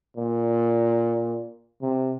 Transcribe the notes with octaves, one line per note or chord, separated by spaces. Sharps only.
A#2
C3